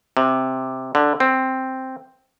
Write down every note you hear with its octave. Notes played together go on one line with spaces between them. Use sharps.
C3
D3
C4